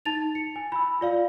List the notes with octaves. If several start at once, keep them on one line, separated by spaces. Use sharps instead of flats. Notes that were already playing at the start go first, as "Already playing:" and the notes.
D#4 A5 A6 F7
C#7
G#5
B5 E6
F4 D5 F5